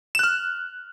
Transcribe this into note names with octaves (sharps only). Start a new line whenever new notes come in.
F6 F#6 E7